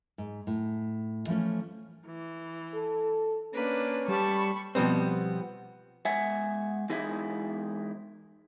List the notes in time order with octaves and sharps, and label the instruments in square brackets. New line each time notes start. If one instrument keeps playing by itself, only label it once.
[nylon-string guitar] G#2
A2
E3 F3 A3 C#4
[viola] E3
[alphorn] A4
[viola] A#3 D4 [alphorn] C#4 [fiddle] B4
[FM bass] G3 [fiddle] A5 [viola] B5 C#6
[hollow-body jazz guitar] B2 F3 G3 B3 C4
[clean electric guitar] G#3 E5 F#5 G#5
E3 G#3 D#4 E4